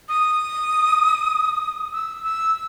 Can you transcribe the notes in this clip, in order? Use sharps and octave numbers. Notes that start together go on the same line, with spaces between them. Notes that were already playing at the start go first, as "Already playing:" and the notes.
D#6
E6
E6